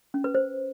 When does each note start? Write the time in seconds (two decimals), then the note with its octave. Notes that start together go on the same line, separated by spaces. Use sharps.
0.14 C#4
0.24 B4
0.35 C5